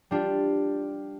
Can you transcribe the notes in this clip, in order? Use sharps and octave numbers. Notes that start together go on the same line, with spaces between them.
G3 D4 F4